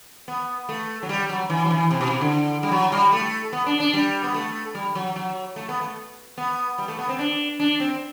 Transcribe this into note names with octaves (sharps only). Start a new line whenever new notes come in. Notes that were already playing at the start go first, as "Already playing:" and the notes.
B3
A3
F#3
G3
F#3
E3
F#3
E3
C3
B2
C3
D3
G3
F#3
G3
A3
B3
D4
D4
G3
B3
A3
G3
F#3
F#3
A3
B3
A3
B3
G3
A3
B3
C4
D4
D4
C4